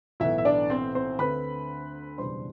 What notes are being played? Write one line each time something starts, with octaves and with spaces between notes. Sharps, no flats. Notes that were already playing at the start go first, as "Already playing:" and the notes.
B1 A2 E3 B3 E4 E5
E5
D4 D5
C4 C5
C4 C5
D2 D3 A3 C4 B4 B5
F#1 E2 B2 G3 D4 C5 C6